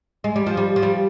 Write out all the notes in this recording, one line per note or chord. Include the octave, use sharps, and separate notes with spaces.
G#3
G3
F3
G3
F3
G3